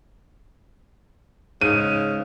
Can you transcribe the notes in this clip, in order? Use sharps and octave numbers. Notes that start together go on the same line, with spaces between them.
G#2 C#3 D#7